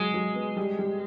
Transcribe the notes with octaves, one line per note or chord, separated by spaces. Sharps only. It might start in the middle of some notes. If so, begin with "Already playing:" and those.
Already playing: F#3 G#3
F#3
B3
G3
G3